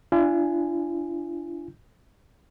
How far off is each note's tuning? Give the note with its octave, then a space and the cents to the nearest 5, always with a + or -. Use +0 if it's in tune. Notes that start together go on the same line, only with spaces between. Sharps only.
D4 +0 F4 -45 G#5 +0